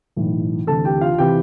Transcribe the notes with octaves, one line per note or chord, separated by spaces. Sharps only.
B1 A2 E3
D2 C3 E3 A4 A5
G4 G5
F4 F5
C3 E3 G4 G5